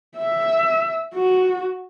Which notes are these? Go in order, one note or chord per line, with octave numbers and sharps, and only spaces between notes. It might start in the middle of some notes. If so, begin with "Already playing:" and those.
E5
F#4